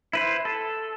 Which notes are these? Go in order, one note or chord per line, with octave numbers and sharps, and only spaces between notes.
E4 B4 C5
A4